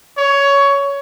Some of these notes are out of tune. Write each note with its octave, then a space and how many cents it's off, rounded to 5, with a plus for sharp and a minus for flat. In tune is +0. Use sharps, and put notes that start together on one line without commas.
C#5 +15